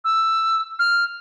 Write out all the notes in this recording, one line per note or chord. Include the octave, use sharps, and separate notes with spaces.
E6
F6